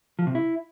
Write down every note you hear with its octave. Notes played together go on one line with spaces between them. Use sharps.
F3
C3
E4